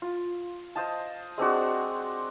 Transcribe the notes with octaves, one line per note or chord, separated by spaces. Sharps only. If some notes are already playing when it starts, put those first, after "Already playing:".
F4
C5 D#5 F5 A5
G#3 C4 D4 F#4